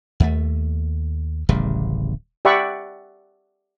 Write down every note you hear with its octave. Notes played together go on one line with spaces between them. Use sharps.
D#2 A3
D1 A1 C#3 G3
G4 D5 E5 F#5 B5 C#6